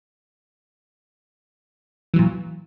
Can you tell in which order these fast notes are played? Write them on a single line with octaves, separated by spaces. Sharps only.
E3 F#3 A#2